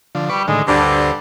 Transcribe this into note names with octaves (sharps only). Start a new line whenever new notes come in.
D3 F3
G3 B4 D5 C#6
A2 D3 D#3 G#3
D2 G2 D3 C5 D5